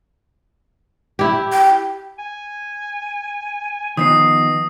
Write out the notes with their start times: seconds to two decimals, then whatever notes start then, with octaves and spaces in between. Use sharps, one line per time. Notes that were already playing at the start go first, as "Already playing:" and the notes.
1.19 E4 G4
1.53 G5
2.18 G#5
3.97 D#3 F3 B3 D#5 D#6 C7